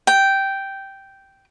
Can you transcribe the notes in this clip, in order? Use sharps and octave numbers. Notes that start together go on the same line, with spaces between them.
G5